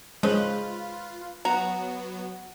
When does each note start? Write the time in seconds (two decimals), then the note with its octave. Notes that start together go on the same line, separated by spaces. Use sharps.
0.23 G#3 C#4 F4 B4 C5
1.45 F#3 B3 F#4 A#5